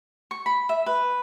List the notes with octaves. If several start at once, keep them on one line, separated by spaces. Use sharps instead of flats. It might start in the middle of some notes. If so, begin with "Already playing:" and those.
C#6
B5
E5
B4